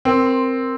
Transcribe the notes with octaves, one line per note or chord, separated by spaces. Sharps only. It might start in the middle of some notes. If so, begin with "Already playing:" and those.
C4 A#4
C6